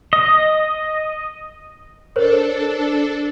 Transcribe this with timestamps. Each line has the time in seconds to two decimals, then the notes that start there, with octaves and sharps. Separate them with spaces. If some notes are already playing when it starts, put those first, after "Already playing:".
0.13 D#5
2.16 D4 A4 A#4 C5 C#5